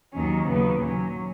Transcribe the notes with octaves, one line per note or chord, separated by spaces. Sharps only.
D#2 D#3 F#3 C#4
D#2 C#3 F#3 B3
A#2 F#3 C#4